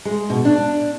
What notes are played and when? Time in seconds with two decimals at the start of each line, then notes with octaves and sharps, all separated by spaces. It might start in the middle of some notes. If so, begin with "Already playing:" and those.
0.05 G#3
0.30 B2
0.45 D4